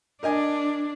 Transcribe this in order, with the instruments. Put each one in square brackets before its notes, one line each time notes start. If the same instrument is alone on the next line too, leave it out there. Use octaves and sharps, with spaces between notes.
[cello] D4 [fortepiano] A#4 D#5 G#5